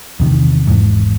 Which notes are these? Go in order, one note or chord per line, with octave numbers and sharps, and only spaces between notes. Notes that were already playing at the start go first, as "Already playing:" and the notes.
E2 C3 D#3
G#1 E2 G#2